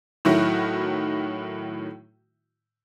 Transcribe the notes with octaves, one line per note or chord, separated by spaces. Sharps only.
A2 D#3 F#3 E4 F#4